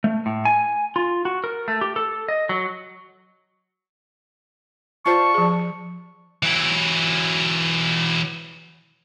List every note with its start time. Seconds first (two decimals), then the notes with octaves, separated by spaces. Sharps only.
0.04 A3
0.26 A2
0.45 G#5
0.96 F4
1.25 F#4
1.44 A#4
1.68 A3
1.81 G4
1.96 A4
2.28 D#5
2.49 F#3
5.06 F4 C5 D5 A5 C#6
5.34 F3 G#4
6.43 E3 F#3